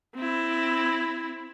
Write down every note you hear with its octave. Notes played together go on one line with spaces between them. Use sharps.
C4 E4